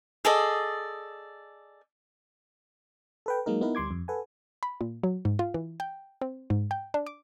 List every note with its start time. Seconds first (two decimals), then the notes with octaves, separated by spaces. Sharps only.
0.25 G#4 A4 D5 D#5
3.26 A4 B4 G5
3.46 F#3 G#3 A#3 D#4 A#4
3.61 B3 D#4 E4 A#4 B4
3.75 D2 G3 C6 D6 G#6
3.91 F2
4.08 A4 B4 F#5 G#5
4.63 B5
4.81 A#2
5.04 F#3
5.25 G#2
5.39 F4
5.54 E3
5.80 G5
6.21 C4
6.50 G#2
6.71 G5
6.94 D4
7.06 D6